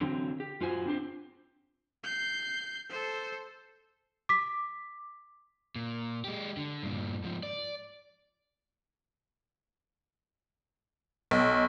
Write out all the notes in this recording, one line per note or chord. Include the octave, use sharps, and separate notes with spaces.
D3 E3 F#3 C4
G4
F#2 F4 F#4 C5 G#5
C4 D4 G4 C5
G6 C7
A4 C5
D6 B6
A#2
G#3 G4
D3
G2 A#2
G#2 F3
D5
B1